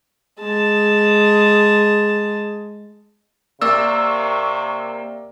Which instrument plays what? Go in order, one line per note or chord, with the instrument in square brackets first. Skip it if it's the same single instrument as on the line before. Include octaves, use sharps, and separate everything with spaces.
[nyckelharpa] G#3 A5
[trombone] C3 [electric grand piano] A#3 E6 [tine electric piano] D5 [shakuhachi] C#6